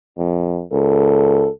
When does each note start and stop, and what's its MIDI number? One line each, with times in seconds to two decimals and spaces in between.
0.18 0.63 41
0.72 1.47 37
0.72 1.50 69